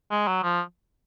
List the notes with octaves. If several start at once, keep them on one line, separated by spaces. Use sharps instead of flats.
G#3
F#3
F3